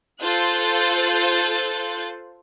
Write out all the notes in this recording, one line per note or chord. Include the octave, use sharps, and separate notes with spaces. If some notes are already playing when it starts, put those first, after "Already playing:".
F4 A4 C5 F#6 G6 A6